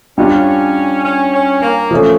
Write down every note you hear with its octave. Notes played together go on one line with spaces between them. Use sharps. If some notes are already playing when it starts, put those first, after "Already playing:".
G3 C#4 D4 F4
C#4
C#4
A#3
F3 A3 C#4